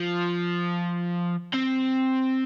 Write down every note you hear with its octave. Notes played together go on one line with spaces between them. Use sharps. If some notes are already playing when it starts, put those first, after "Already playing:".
Already playing: F3
C4